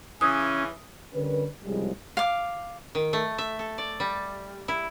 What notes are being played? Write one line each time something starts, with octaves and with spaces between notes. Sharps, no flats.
C#3 E3 C#4 D#6
D3 G3 C#4 A#4 B4
C2 C#3 F3 G3 G#3
F5 D6
D#3
A3
E5
A4
D5
G3
E4